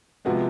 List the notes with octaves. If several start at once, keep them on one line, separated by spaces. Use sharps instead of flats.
C3 F3 G#3 B3 F#4